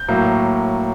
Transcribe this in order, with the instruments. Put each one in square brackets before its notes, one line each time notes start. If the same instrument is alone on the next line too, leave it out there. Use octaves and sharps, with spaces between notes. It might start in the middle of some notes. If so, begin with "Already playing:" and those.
Already playing: [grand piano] G6
A2 F#3 A#3